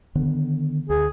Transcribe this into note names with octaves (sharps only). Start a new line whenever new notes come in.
D3 D#3 B3
D2 G#4